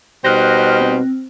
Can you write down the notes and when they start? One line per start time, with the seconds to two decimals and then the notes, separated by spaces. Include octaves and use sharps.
0.24 B2 G3 D#4 C5 F6 F#6 A#6
0.81 C4